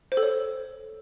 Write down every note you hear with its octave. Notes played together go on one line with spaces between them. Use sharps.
C5
A4
C#5